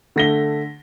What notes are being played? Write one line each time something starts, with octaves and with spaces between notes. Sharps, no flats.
D3 A3 A#6 B6 G7